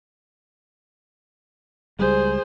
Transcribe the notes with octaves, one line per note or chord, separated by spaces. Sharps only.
C#2 G3 G#3 G#4 C5